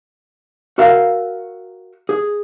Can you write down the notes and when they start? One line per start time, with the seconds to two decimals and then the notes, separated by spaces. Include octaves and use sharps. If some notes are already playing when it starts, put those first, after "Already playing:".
0.78 F#4 A#4 E5 F5
2.09 G#4